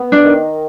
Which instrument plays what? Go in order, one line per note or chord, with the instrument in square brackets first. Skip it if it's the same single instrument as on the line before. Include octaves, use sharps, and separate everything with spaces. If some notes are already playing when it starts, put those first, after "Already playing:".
Already playing: [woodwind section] B3
[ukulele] D4
[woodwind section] D#3